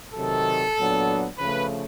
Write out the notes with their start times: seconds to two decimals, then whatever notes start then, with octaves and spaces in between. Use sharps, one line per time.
0.15 C3 D#3 F#3 A4
0.77 A#2 F#3 B3 D4
1.38 C#3 F3 A3 B4